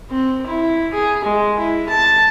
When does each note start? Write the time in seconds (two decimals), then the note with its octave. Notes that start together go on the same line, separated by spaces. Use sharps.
0.11 C4
0.47 E4
0.94 G#4
1.25 G#3
1.59 E4
1.89 A5